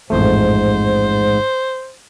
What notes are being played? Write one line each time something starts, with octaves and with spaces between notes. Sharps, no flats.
A1 F2 G#2 A3 C5